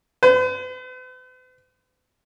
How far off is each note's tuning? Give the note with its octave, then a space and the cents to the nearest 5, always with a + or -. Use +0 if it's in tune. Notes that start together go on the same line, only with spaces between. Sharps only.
B4 +45